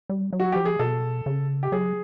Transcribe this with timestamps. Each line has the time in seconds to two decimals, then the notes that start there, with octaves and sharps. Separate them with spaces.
0.10 G3
0.33 F#3
0.40 F#4
0.52 F3 G4
0.65 G#4
0.79 B2 A4
1.26 C#3
1.63 G4
1.72 F#3 G#4